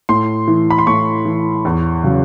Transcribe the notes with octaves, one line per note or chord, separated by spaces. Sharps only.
A2 C6
E3
B5
C6
A2 C#6
E3
E2
C#3 F#3